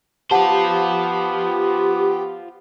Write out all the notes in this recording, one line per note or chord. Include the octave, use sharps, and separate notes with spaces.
B3 F4 G4 C5 F#5 A5